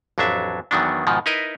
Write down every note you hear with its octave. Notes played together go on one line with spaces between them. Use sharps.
A1 F2 F#3 D4 E5
E2 D#3 F#3 B3 D4
G#2 B2 D#3 F3
D#4 E4 A#4 B4 D#5